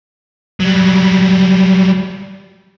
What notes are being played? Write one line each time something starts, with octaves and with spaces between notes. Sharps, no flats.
F#3 G3